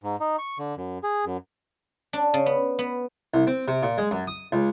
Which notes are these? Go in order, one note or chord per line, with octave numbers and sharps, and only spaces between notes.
G#2
D#4
C#6
D3
F#2
G#4
F#2
D4
C#3
B3
B3
C2
C4
C3
A#2
G#3
F#2
D#6
C#2